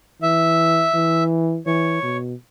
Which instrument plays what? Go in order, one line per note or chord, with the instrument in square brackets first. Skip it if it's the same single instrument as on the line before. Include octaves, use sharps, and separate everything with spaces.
[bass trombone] E3 [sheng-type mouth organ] E5
[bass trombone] E3
[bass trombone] E3 [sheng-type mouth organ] C#5
[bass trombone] B2